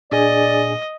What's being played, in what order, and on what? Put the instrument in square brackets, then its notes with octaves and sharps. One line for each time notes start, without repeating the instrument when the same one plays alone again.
[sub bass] A#2 [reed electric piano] D4 G#4 G#5 [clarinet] D5 [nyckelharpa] D#5